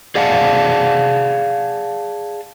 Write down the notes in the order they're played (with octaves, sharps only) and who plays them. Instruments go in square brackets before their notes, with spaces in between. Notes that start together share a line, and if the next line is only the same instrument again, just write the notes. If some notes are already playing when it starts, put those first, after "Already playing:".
[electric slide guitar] G#4 D5 F5 F#5 G#5 A5